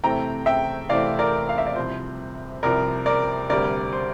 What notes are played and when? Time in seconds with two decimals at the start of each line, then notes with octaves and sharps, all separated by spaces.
0.04 C3 E3 A3 C4 G5 A#5
0.46 E5 G5
0.89 C3 E3 A3 C4 D5 F5
1.19 A#4 D5
1.49 F5
1.58 E5
1.67 D5
1.76 C2 C3 F3 C5
2.63 C2 C3 F3 A#4 D5
3.06 A#4 D5
3.49 D2 C3 G3 A#4 D5
3.93 C5